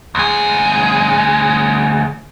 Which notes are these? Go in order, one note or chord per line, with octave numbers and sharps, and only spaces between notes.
D2 G#4